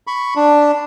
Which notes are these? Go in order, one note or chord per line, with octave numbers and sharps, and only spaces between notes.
B5 C#6
D4